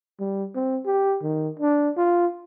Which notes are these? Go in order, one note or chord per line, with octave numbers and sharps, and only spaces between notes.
G3
C4
G4
D#3
D4
F4